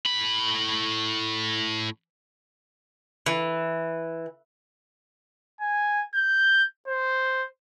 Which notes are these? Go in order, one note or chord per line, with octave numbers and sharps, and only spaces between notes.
A2 B5
E3
G#5
G6
C5